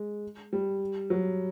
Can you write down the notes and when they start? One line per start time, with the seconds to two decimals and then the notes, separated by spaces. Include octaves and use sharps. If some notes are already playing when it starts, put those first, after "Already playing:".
Already playing: G#3
0.53 G3
1.10 F#3